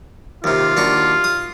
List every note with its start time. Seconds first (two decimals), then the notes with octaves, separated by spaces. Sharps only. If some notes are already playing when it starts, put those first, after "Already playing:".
0.44 D#2 C3 F4
0.77 D#2 D4 F#4
1.24 D#6